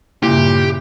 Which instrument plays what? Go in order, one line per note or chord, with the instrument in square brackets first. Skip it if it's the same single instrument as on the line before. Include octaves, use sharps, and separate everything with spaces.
[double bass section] G2 C#3 [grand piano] A#2 [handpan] E4 [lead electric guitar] G4